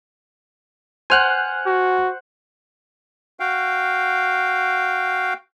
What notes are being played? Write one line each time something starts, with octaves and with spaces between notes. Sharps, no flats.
C5 F#5 G#5 F6 F#6
F#4
F#4 F5 G5